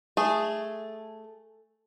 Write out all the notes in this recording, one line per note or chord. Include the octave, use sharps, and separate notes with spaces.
A3 G#4